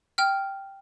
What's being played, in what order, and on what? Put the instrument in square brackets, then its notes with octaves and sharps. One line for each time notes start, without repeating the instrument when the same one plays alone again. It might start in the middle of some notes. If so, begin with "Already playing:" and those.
[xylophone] G5 F6